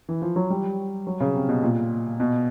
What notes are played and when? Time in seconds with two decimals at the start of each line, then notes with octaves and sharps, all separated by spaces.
0.09 E3
0.22 F3
0.36 F#3
0.50 G3
1.07 F#3
1.20 C#3
1.34 C3
1.49 B2
1.63 A#2
2.20 B2